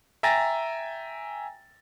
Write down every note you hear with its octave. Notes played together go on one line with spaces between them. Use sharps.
E5 G5 G#5 A#5 A6 A#6